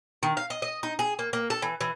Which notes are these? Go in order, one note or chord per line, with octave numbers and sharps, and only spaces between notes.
D#3
F5
D#5
D#5
D#4
G#4
A#3
A#3
A4
E3
E3